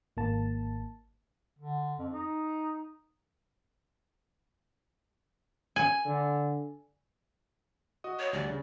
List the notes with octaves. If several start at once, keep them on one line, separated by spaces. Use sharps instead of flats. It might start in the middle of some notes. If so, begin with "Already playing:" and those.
G#1 A#3 A5
D3
F2
D#4
G#5
D3
F#4 D#5 D#6
C#5
D2 G3 D5
C#3